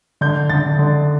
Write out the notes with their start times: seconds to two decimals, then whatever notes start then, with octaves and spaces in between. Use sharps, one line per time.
0.21 D3 G6
0.49 D3 A6
0.79 D3